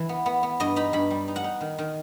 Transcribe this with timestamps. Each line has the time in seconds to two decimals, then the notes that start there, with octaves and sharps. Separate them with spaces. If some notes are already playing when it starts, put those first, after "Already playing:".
Already playing: E3
0.09 B3
0.26 B3
0.43 B3
0.60 G2 D#5
0.76 D#4 B5
0.93 G2 B5
1.10 G3
1.28 D#4
1.36 F#5
1.44 D#4
1.61 D#3
1.78 D#3